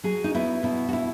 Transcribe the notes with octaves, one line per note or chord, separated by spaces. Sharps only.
F#3 G#4
D#4
B3 E4
B2 E4
F#4
E4